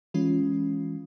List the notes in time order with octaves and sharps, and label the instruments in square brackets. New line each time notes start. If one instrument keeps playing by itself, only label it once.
[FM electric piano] E3 G#3 C#4 F4